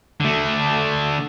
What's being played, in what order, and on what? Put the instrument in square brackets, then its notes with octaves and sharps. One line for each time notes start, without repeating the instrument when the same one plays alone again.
[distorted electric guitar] D3 A3